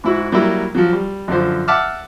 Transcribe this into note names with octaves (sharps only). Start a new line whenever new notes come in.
G#2 E4 F#4
F#3 G3 A#3 E4
F3 F#3
G3
F#2 D3 F3 C5
E5 F#5 A5 D6 E6 F6